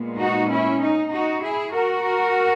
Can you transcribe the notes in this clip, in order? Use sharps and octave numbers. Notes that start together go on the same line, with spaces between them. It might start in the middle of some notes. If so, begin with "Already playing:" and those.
Already playing: A#2 G#3 B3
D#4 F#4
C#4 E4
D#4
D#4 F#4
E4 G#4
F#4 A#4